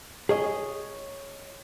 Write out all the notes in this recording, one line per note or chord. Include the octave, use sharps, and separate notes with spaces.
G#4 C#5 D#5